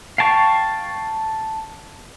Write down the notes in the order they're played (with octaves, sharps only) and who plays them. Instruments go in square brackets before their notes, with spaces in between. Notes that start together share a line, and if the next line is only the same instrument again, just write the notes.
[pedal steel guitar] F5 G5 A5 C#6